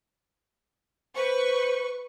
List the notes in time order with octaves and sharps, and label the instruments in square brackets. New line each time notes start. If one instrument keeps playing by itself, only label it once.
[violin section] B4 C#6 [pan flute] C5